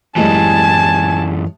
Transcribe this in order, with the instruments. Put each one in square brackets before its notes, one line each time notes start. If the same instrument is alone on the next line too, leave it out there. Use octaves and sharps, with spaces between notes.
[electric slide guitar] F#2 E3 [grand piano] A2 G3 G#3 [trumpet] G#5 [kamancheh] A5